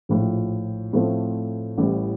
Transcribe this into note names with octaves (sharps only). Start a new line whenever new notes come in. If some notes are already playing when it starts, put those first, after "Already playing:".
A#1 A2 F3
A2 F3 A3 C4
A1 A2 G3